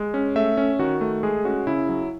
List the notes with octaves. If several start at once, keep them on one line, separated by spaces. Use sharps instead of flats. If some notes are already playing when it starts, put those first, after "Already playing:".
Already playing: G#3
C#4
A3 E5
C#4
D#3 F#4
A3
G#3 G#4
C#4 F#4
C#3 E4
F#3